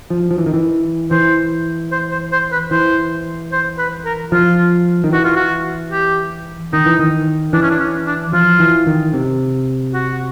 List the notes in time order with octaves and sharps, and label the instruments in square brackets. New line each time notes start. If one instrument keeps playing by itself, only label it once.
[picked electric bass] F3
F3
E3
D#3
E3
[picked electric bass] E3 [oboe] C5
[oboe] C5
C5
C5
B4
[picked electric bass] E3 [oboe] C5
[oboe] C5
B4
A#4
[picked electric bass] F3 [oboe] F4
[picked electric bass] D#3
[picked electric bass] E3 [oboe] F#4
[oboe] F4
F#4
G4
[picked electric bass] D#3 [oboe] D#4
[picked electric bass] E3
D#3
[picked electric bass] E3 [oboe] D4
[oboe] C#4
D4
C#4
D4
[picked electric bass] F3 [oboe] F4
[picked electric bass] E3
D#3
C3
[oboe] F#4